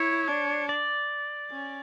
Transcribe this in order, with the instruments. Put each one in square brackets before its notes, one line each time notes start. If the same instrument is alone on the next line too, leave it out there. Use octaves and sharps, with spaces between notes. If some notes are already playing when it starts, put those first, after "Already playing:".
Already playing: [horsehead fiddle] E4 [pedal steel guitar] C#5
[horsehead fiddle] D4
[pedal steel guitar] D5
[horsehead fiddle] C#4